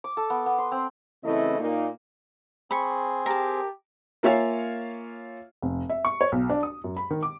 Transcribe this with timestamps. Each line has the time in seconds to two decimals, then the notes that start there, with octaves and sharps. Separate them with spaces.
0.04 D6
0.17 A4
0.30 B3
0.46 B3
0.58 C6
0.72 C4
1.23 C#3 E3 A3 C4 E4 D#5
1.60 A#2 A#3 D#4
2.71 C4 G#4 B5 C#6
3.26 G4 A#4 A5
4.23 A#3 F4 C#5 E5 F5 G#5
5.62 F1
5.90 E5
6.05 C#6
6.21 C#5
6.32 B1
6.50 D4
6.63 D#6
6.84 F#2
6.97 B5
7.10 D#3
7.23 D6